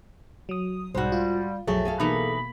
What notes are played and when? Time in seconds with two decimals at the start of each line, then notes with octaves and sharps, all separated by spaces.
0.49 F#3 D#6
0.95 B1 G#2 G3 G#3 F#4 C5
1.12 F4
1.67 B1 F2 F#3 A3 G#4 C#6
1.85 F#3 G#4 A4 F5
2.00 B2 E3 A#3 D#4 B5